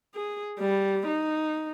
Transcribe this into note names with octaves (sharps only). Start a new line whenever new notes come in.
G#4
G3
D#4